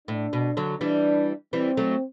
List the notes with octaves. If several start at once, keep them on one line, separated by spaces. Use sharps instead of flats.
A2 D4
B2
D3 F#3
E3 G3 D4
E3 G3 C4
F#3 A3